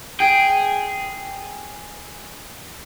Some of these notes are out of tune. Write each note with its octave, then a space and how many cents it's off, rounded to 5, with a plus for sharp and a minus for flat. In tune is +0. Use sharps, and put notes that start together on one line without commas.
G#4 -5 G5 +0